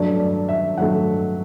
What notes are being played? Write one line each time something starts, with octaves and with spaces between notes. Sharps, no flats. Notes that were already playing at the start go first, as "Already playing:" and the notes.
Already playing: G2 F#3 A3 D5
D5
E5
G2 F#3 A3 F#5